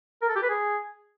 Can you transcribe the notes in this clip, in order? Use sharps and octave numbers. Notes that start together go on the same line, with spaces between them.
A#4
A4
G4
B4
G#4